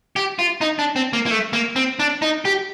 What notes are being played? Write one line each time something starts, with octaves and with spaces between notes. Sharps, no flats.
G4
F4
D#4
D4
C4
A#3
A#3
A3
A#3
C4
D4
D#4
G4